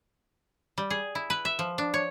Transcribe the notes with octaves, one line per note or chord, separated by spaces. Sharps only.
G3
G#4
E4
B4
E5
F3
D4
C#5